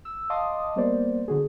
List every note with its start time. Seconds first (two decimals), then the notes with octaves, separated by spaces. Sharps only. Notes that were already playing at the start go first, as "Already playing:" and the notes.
0.05 E6
0.30 D#5 F5 A5 C6 D6 D#6
0.76 G3 A#3 B3 C5 D5
1.28 D3 F#4 G#4